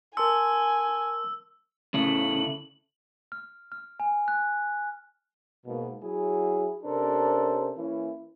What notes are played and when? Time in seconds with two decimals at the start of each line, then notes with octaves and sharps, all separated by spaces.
0.17 A#4 G#5 A5 C6 E6
1.94 A2 C#3 A3 F#7
3.32 F6
3.72 F6
4.00 G#5
4.28 F#6
5.66 G#2 B2 A#3
6.03 F#3 E4 G#4
6.84 C3 C#4 D4 A4 A#4 C5
7.77 E3 A#3 C#4 E4